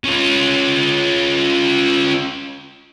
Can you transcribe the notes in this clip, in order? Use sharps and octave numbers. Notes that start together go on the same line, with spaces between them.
C#4 F4